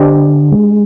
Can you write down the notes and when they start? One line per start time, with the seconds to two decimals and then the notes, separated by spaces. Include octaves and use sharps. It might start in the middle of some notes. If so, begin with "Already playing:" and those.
Already playing: D3 D4 G4 C5 D#5
0.52 G#3